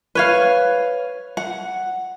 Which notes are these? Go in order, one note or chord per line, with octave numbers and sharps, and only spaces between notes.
B4 C#5 F5
F#5